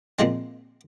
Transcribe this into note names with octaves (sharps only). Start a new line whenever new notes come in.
A#2 F3 G#3 C4